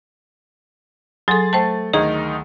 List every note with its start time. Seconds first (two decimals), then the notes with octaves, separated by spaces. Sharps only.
1.28 F#3 G#4 A4 C6 A6
1.53 A3 C5 G5 A5
1.93 D2 D#3 D#4 G#4